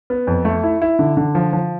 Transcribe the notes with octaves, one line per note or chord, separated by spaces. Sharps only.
B3
F2
A3
E4
E4
D3
D3
F3
F3